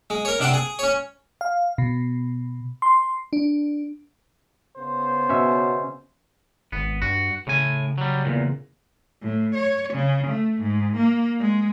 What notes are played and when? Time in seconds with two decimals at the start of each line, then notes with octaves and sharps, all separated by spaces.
0.10 G#3
0.25 A#4 C#5
0.40 C3 D4 C5 F#5 G5
0.53 G#4
0.79 C#4 C#5
1.41 F5
1.78 B2
2.82 C6
3.33 D4
4.76 C#3 B3 C5
5.29 B2 C#4 E5
6.72 G#1 B3
7.02 G2 F#4
7.47 A2 C#3 G#5
7.98 F#3 G3
8.25 E2 A#2
9.22 A2
9.55 C#5
9.94 C#3
10.27 A3
10.61 G#2
10.96 A#3
11.41 G#3